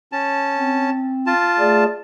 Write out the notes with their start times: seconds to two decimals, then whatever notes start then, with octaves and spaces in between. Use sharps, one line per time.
0.12 C#4 A5
0.57 C4
1.26 F4 A5
1.59 A3 G#4 D5